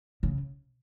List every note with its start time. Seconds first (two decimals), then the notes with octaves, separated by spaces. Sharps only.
0.23 C#3